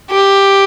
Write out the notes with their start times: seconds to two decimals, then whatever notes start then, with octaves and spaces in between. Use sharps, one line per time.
0.11 G4